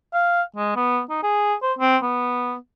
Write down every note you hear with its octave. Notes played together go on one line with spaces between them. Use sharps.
F5
G#3
B3
D#4
G#4
C5
C4
B3